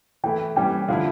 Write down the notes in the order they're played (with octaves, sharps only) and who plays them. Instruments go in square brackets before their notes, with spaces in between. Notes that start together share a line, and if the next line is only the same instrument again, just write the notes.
[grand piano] E3 A3 E4 [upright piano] G5
[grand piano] E3 G3 C#4 G4 [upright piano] G5
[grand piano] D3 F3 A3 E4 [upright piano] F5